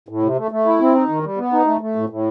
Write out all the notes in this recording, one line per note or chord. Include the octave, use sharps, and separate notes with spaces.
A2
C3
A3
A3
E4
C4
D#4
D#3
G3
B3
D#4
A3
A3
A2
A2